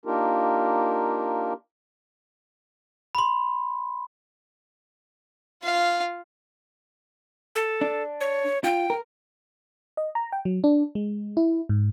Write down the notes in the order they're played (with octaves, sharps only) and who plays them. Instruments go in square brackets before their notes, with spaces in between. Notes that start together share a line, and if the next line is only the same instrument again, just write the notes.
[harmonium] A#3 D4 D#4 F4 G4 A#4
[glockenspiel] B5 C6
[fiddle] F4 F5
[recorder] A4
[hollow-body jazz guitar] D4
[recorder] C#5
[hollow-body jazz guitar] F4 [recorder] G5
[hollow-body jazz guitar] A#4
[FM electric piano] D#5
A#5
G5
F#3
D4
G#3
E4
G#2